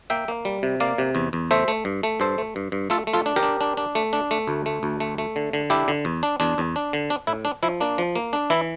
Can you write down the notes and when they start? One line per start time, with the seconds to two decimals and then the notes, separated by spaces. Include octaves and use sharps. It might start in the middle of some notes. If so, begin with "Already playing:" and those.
0.10 A#3 E5 G5
0.28 A#3
0.45 G3
0.63 C3
0.80 A#3 D5 F5
0.98 C3
1.15 E2
1.33 E2
1.51 A3 C5 E5
1.68 A3
1.85 G2
2.03 A3
2.20 G2 A4 C5
2.38 A3
2.56 G2
2.72 G2
2.90 A3 F4 A4
3.07 A3
3.13 F4 A4
3.26 D4
3.36 G4 A#4
3.43 D4
3.61 D4
3.77 D4
3.95 A3
4.13 D4
4.31 A3
4.47 D2
4.66 A3
4.83 D2
5.00 A3
5.18 A3
5.36 D3
5.53 D3
5.70 D4 E4 G4
5.88 D3
6.05 E2
6.23 D4
6.40 E2 D4
6.58 E2
6.76 D4
6.93 D3
7.10 D4
7.27 A2 E4
7.45 D4
7.63 F3 E4
7.80 A#3 D4
7.98 F3
8.16 A#3
8.33 D4
8.50 E3 E4